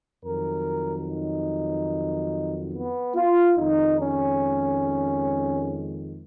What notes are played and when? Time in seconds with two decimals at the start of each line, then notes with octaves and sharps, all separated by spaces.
0.24 F2 D#3 F#3 A#4
1.08 D#4
2.73 B3
3.16 F4
3.57 F2 D#3 G#3 D#4
3.98 C#4